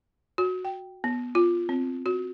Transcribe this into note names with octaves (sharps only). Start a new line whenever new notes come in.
F#4
G5
B3
F4
C4
F#4